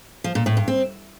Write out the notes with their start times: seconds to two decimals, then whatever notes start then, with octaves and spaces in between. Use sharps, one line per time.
0.24 F3
0.35 A#2
0.46 A2
0.57 G2
0.68 C4